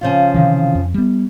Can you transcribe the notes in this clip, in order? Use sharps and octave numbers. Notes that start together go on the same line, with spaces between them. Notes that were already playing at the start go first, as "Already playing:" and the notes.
C#3 F3 F4
C3 D#3 E3
F2
G3 B3